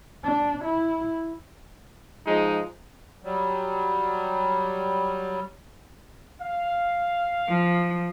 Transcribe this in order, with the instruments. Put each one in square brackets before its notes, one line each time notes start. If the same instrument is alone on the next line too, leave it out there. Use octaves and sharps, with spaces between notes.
[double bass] D4
E4
[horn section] F3 G#3 D#4
[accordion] F#3 G3
[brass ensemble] F5
[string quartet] F3